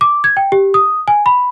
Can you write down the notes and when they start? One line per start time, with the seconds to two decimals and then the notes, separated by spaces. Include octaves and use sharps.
0.01 D6
0.24 G#6
0.37 G5
0.52 G4
0.74 D#6
1.08 G#5
1.26 B5